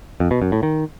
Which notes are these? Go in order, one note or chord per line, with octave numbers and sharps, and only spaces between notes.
F2
B2
F#2
A2
D#3